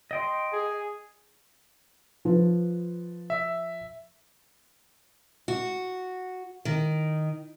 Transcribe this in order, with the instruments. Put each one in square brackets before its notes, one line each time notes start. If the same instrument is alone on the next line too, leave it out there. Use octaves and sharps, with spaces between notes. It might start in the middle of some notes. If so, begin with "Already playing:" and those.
[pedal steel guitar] D#5 G5 C6
[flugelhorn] G#4
[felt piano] F3 B4
[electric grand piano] E5
[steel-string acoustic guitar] F#4
D#3